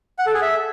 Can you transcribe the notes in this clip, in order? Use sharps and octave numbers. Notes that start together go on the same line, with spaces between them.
F#5
A4
G#4
E5